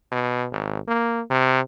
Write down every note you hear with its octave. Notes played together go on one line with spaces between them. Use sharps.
B2
G#1
A#3
C3